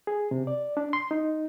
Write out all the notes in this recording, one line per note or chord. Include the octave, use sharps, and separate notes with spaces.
G#4
C3
D5
D4
C6
D#4